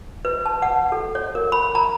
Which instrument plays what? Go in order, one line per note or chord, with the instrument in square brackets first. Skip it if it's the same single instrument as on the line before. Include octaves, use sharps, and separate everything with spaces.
[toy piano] B4
A5
F#5
A4
C#5
A#4
B5
A#5